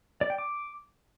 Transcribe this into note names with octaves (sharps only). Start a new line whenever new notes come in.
D5
G5
D6